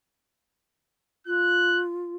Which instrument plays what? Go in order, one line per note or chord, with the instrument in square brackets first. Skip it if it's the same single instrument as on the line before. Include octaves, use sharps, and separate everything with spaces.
[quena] F4 [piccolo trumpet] F#6